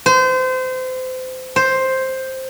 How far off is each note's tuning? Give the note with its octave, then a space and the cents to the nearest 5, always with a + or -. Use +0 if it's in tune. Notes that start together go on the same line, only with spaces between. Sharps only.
C5 -30
C5 +5